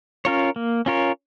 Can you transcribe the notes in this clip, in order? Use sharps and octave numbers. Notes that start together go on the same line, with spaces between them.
C#4 F4 A#4 C#5
A#3
C#4 F4 A#4 C#5